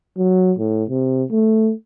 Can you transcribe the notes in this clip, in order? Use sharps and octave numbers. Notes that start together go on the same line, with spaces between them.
F#3
A2
C3
A3